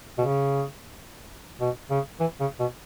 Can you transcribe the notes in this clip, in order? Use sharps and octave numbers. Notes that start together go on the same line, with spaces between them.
B2
C#3
B2
C#3
E3
C#3
B2